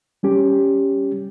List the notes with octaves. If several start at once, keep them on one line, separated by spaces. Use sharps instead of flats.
G3 C#4 G4